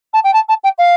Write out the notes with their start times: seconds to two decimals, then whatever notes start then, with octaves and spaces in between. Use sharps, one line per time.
0.13 A5
0.24 G5
0.33 A5
0.48 A5
0.63 G5
0.78 F5